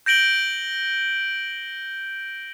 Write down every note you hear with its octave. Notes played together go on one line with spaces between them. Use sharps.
G6 A#6 D7 F#7 G7